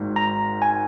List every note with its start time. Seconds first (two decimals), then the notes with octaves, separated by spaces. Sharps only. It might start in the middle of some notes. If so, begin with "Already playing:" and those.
Already playing: G#1 G#2 D#3 A#3
0.16 A#5
0.62 G#5